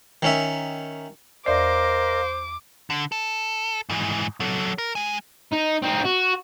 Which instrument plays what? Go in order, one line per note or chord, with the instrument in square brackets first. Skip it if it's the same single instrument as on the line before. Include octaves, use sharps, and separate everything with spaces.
[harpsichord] D#3 C#4 E5
[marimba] E2 D5 [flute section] A#4 D#5 F5 [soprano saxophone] C5 [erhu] D6
[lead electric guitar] D3
A4
G#2 E3
F#3 A4
A#4
G#3 G#5
[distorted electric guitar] D#4
C4 D#4
F#4